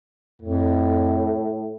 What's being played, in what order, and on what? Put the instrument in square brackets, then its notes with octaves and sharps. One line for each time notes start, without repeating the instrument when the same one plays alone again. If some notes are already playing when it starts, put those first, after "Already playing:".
[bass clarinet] F2 [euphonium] A2